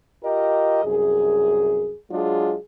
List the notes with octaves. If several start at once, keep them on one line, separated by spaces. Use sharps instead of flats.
F4 G4 A#4 D#5
C2 F#2 G#4
F#3 G#3 D4 F4 G#4